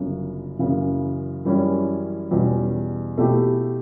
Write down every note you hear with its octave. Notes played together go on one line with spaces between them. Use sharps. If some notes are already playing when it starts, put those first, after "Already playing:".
Already playing: G1 F#2 C#3
F#1 F#2 C#3 E3
F#2 E3 G3 C#4 E4
E2 B2 G3 C#4
B2 A3 E4 G4